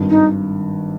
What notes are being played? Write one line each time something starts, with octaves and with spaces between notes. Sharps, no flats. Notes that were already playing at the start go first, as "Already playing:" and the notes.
Already playing: G#1 G2 D#3
D#4